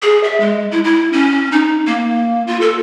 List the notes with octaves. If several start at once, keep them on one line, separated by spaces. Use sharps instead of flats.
G#4
E5
G#3
E4
E4
C#4
D#4
A#3
F4
A4